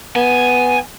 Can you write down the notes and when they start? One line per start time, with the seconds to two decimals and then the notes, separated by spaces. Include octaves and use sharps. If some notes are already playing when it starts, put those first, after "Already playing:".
0.16 B3 G#5